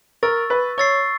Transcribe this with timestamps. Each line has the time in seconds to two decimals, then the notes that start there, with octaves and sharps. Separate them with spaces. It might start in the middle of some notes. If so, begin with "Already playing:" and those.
0.23 A#4 C#6 E6 A6
0.50 B4
0.78 C#5 C#6 E6 A6 C7